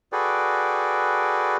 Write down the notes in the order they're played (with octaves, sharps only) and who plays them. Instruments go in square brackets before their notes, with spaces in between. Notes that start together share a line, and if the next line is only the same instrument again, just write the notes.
[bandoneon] F#4 G#4 A4 B4 D5 G5